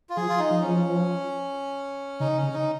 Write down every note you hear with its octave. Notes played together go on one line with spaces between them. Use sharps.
F4
F3 G#4
F4
D#4
F3
C#4
C#3 D#4
C#4
C#3
D#4